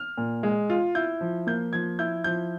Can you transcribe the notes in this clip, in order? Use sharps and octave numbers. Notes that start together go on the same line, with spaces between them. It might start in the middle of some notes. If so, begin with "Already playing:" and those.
Already playing: F6
A#2
G#3
F4
E4 G6
F3
A#3 G6
F3 G#6
E4 G6
F3 G6